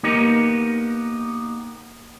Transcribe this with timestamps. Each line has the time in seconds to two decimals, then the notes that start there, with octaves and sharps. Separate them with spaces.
0.03 A#3 B3 D#4 G4 A#4